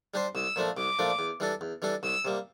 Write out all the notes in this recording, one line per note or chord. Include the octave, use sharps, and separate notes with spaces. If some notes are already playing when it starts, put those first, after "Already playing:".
G3 D4 G4 C5
C2 E6
A#2 F3 A3 D4
C2 D6
A#2 F3 A3 D4
E2
E3 G3 D4 A4
E2
E3 G3 D4 A4
C2 E6
C3 G3 A#3